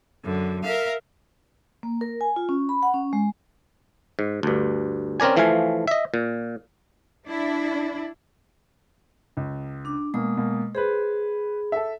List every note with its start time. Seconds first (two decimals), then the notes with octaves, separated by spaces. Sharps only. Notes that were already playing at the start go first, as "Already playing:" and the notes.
0.23 F#2 D3
0.63 A#4 E5 F5
1.83 A#3
2.01 A#4
2.21 G#5
2.36 F4
2.49 C#4
2.69 B5
2.83 F#5
2.94 C#4
3.13 G#3
4.19 G#2
4.43 D2 G2
5.20 C4 C#4 A#4 D5 G#5
5.37 E3 F3 A3 F5 G#5
5.88 D#5 E5
6.14 A#2
7.27 D4 E4
9.37 C#2
9.85 D4 D6
10.14 B2 G#3 A#3 D#6
10.37 B2 A#3
10.75 G#4 B4 C5 B5
11.72 A4 E5